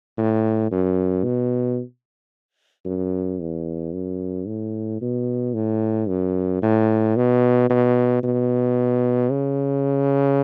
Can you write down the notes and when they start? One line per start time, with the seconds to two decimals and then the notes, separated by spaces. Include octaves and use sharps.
0.17 A2
0.71 F#2
1.24 B2
2.85 F#2
3.40 E2
3.93 F#2
4.47 A2
5.01 B2
5.54 A2
6.08 F#2
6.62 A2
7.16 B2
7.70 B2
8.23 B2
9.31 C#3